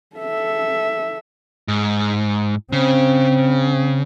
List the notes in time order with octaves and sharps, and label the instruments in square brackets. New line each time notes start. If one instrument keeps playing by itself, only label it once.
[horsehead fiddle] A4 E5
[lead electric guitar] G#2
[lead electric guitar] C#3 [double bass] C4